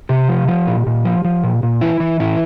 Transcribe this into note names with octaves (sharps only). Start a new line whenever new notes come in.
C3 G4
F3
F3
A#2
A#2
F3
F3
A#2
A#2
E3 E4
E3
A2 E4